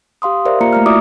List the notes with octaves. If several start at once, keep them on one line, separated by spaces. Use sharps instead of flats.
G4 F5 C6 D#6
G4 A#4 C5 D5 E5 F5
A#3 F4 A#5 C#7
A3 A#5 F6
E4 F#4 D5 E5 D6 D#6